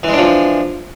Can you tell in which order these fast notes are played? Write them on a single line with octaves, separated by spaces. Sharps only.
E3 G#3 D4 F3